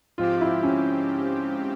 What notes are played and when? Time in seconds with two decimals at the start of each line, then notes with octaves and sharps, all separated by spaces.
0.18 G#2 F3 C4 F4 G4
0.41 E4
0.63 C#4